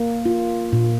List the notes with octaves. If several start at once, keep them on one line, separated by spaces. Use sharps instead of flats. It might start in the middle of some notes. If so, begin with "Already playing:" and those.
Already playing: A#3
F4
A#2